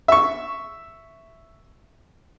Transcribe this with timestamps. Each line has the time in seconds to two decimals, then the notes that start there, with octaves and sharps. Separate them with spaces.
0.08 E5 C#6